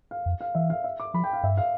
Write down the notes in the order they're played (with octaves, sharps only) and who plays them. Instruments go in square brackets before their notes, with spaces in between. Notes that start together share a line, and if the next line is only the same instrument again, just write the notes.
[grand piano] F5
[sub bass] F2
[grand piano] F5
[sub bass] E3 [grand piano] E5
[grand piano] F5
E5
D6
[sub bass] F3 [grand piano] B5
[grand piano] G5
F5
[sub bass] G2 [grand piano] E5
[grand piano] F5